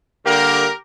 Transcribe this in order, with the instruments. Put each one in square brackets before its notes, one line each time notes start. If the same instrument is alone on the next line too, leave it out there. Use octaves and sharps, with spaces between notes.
[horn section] D3 G3 A#3 G4 A#4